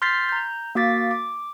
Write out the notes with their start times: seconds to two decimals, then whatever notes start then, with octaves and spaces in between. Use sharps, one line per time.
0.02 C6 F6 G6 A6 B6 C7
0.29 A#5 G6
0.75 A#3 F#4 F5 D6 A6 B6
1.11 D6